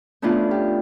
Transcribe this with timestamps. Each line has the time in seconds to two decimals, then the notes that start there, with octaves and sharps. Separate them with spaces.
0.22 A3 B3 C#4 D4 E4 F4
0.51 G4